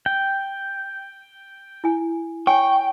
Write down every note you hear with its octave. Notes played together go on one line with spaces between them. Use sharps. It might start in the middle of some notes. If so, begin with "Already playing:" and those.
G5
E4 G#5
C#5 G5 G#5 C#6